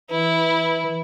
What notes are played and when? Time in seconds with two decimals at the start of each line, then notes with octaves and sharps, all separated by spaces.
0.11 E3 E4